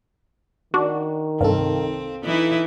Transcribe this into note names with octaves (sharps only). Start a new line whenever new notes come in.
D#3 D4 F#4
C2 G2 C4 A4 F5
E3 D#4 E4